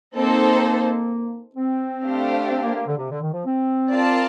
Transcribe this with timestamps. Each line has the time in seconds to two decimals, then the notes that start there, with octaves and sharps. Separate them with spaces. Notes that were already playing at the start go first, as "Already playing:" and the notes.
0.15 A#3 C4 D#4 A4 C5
1.56 C4
2.03 A3 D4 G4 C5 F5
2.50 C4
2.62 A#3
2.75 A#3
2.87 D3
2.98 C3
3.10 D3
3.22 D#3
3.33 F3
3.46 C4
3.92 F4 A#4 D5 F5 A5